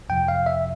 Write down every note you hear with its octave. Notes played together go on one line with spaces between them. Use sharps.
F2 C3 F3 G5
F5
E5